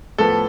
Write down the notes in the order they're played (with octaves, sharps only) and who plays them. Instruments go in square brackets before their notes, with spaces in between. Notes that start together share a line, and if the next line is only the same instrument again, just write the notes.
[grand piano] A2 F3 B3 A4